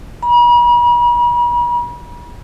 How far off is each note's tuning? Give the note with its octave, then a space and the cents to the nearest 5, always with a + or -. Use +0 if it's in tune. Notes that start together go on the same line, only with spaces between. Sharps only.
B5 -45